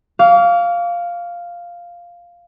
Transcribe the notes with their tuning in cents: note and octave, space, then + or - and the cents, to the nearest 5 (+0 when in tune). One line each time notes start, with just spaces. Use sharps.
F5 +0 D6 -45